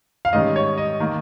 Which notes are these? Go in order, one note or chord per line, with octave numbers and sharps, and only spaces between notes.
F5
G#2 D#3 G3 C#4 D#5
C#5
D#5
D#3 A#3